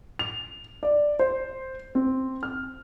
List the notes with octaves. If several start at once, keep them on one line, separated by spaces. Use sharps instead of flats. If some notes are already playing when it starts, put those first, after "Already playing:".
F7
D5
C5
C4
F6